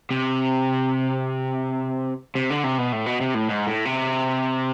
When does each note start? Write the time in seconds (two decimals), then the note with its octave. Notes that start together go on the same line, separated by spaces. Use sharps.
0.10 C3
2.35 C3
2.50 D3
2.64 C3
2.78 B2
2.92 A2
3.06 B2
3.21 C3
3.34 A2
3.49 G#2
3.67 A2
3.86 C3